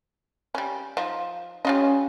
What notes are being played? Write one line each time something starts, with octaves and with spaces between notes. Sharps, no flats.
G3 C#4
F3 D#4
G3 C#4 F4 D#5